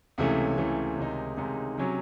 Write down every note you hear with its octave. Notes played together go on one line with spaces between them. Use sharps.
C#2 C3 E3 A3 C#4
C#2 C3 E3 A3 C#4
C#2 C3 D#3 G#3 D#4
C#2 C3 D#3 G#3 D#4
C3 F#3 C#4